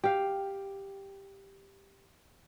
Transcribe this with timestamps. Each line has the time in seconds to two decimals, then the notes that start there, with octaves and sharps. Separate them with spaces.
0.04 G4 F5